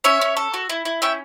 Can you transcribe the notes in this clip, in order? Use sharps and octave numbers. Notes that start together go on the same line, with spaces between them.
C#4 C#5 E5
C#4
A4
F#4
E4
E4
C#4 E5 G5